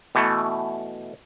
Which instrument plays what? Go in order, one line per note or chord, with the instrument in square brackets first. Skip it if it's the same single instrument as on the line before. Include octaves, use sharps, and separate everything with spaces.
[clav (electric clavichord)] B2 E3 A3